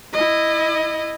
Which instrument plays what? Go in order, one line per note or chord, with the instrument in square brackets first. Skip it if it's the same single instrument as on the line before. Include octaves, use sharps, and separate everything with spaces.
[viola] E4 D#5